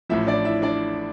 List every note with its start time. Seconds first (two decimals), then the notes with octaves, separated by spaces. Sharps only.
0.09 A1 A2 F3 E4 E5
0.27 D4 D5
0.45 E4 E5
0.62 D4 D5